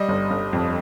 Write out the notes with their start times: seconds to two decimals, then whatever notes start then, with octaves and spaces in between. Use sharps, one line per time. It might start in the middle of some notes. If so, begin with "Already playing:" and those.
Already playing: G3 D#5
0.09 G1
0.31 G1
0.53 F2